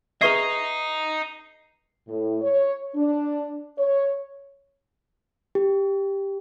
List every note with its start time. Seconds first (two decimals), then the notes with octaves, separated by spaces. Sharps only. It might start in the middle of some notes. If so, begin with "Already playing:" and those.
0.21 G#4 B4 D#5 E5 A#5 C#6 G#6 C7
2.08 A2
2.42 C#5
2.95 D4
3.79 C#5
5.55 G4